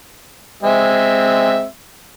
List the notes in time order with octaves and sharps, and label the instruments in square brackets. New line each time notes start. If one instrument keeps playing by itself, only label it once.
[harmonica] G#3 C4 E5